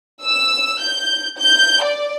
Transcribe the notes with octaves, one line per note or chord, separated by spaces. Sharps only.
E6
G6
G6
D5